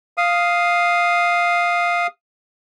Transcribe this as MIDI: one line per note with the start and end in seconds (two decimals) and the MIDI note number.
0.18 2.07 77
0.18 2.07 87